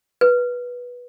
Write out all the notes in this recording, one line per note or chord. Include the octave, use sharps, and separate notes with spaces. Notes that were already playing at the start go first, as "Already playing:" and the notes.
B4